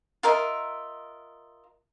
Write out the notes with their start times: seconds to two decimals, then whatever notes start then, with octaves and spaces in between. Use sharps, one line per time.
0.23 F4 A#4 D#5 E5